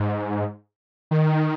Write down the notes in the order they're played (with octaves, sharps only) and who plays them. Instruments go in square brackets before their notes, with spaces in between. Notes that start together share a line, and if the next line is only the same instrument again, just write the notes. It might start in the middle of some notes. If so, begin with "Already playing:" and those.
Already playing: [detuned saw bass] G#2
D#3